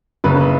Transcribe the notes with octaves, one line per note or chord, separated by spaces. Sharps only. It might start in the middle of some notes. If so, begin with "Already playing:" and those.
F#1 F#2 C#3 B4